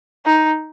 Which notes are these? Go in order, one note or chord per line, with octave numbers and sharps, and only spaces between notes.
D#4